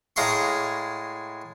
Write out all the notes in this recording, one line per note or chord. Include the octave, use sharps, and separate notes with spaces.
A2 G#3 F5 A#5 C6 C#6